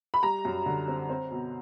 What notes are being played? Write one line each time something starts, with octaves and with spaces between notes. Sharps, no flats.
B5
G3 A#5
F#2
D3
C4
C4
B2